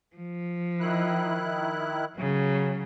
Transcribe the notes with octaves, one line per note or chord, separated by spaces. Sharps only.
F3
D#3 E4 F#6
C#3 F#3